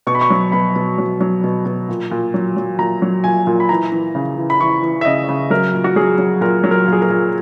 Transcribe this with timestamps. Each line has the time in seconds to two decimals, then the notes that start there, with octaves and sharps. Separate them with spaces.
0.07 B2 C#6
0.15 B5
0.21 C#6
0.30 F#3
0.52 B2 B5
0.76 B2
0.98 F#3
1.21 F#3
1.44 B2
1.65 B2
1.89 A#2
2.11 A#2
2.34 F#3
2.56 F#3
2.78 A#2 A#5
3.02 F#3
3.24 A#2 G#5
3.47 A#2
3.60 B5
3.69 E3 A#5
3.92 E3
4.15 C#3
4.38 E3
4.50 B5
4.61 E3 C#6
4.83 E3
5.01 E5
5.05 C#3 D#5
5.29 C#3
5.50 F#3 A#4
5.73 A#2
5.84 F#4
5.96 F#3 G#4
6.18 F#3
6.41 A#2 A#4
6.64 F#3
6.71 A#4
6.87 A#2 G#4
7.02 A#4
7.10 A#2